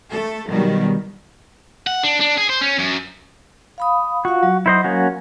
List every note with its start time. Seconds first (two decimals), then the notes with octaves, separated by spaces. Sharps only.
0.12 A3 A4
0.46 B2 D#3 F#3 G3
1.87 F#5
2.03 D4
2.20 D4
2.37 G#4
2.49 C5
2.61 C#4
2.79 F#2
3.78 F5 B5 D#6
4.25 F4 F#4 F5
4.43 F#3
4.66 E4 C5 D#5
4.84 A#3 C#4 F#4